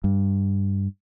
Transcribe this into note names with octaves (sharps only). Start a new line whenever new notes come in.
G2